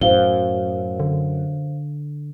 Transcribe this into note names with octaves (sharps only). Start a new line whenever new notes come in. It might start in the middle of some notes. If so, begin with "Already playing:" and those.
F#2 A2 C5 F5 G7
D3